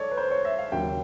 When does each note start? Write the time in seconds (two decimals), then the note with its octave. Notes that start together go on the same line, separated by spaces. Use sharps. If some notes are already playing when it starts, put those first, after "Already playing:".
Already playing: A4 C#5 D5
0.11 B4
0.17 C5
0.31 C#5
0.45 E5
0.58 F5
0.72 D#2 C#3 F#3 G5